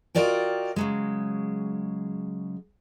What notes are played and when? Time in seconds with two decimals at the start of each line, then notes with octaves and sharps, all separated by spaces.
0.15 F4 F#4 A#4 D5 D#5 G5
0.76 C#3 F#3 G#3